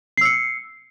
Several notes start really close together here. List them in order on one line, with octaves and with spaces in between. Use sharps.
C7 E6 C#7